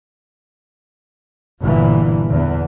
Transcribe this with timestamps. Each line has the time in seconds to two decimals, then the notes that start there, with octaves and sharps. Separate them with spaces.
1.62 G1 A#2 D3 E3
2.29 E2 D3 E3